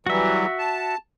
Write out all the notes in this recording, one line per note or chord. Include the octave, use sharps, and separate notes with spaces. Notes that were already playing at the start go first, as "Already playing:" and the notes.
E3 F#3 G3 F#4 E5
A5